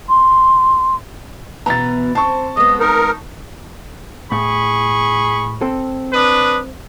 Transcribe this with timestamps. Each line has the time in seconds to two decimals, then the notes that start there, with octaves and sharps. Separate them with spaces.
0.09 C6
1.66 B2 E3 B3 A#5 A6
2.15 C4 A5 C#6
2.57 G#3 B3 D#5
2.80 D#4 A#4
4.32 A2 G#4 B5 C#6
5.61 C4 A4
6.13 D4 B4 D#6